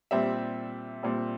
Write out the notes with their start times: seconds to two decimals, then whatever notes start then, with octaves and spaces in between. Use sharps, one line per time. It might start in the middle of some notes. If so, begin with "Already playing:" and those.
0.11 A#2 G3 C4 E5
1.03 A#2 G3 C4